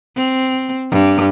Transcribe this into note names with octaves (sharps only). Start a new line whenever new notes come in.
C4
G2